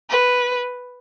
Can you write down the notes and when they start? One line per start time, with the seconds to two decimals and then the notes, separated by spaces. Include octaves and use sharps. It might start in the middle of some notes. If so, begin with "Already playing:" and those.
0.10 B4